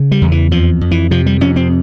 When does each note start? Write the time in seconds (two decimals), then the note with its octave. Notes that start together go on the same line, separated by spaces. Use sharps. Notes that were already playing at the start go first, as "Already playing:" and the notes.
Already playing: C#3
0.11 G3
0.22 E2
0.32 E3
0.51 F2 F3
0.81 F2
0.91 E3
1.11 C3 F3
1.26 G3
1.41 F2 C#4
1.56 C4